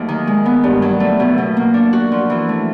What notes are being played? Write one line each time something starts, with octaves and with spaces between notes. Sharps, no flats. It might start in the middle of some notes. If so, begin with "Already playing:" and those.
Already playing: D#2 F#3 A3
D#3
G#3
B3
G2
F#3
A3
B2
B2
A#3
D4
F#4
F3
E3
A3